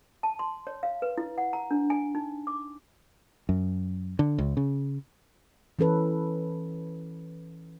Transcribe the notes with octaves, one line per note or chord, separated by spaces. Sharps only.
A5
C6
C#5
F5
B4
E4
F#5
A#5
D4
G#5
D#4
D6
F#2
D3
C#2
C#3
E3 C#4 A4 B4